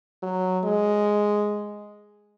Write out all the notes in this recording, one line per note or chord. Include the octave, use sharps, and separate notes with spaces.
F#3
G#3